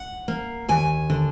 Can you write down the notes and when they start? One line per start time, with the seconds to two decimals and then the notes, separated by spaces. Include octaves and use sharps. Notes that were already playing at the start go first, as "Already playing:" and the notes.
Already playing: F#5
0.28 A#3
0.68 D#2 G#5
1.10 D3